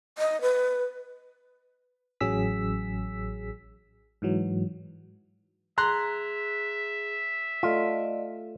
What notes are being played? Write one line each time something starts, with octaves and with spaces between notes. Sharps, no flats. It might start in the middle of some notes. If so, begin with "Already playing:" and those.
D#5
B4
A1 F#3 C#4 G#4 E6 B6
G#2 E3 F#3
G#4 E5 A#5 C6 F#6
A3 F4 D5 D#5